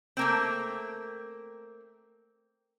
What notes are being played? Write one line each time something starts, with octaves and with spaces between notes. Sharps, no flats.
A3 A#3 C4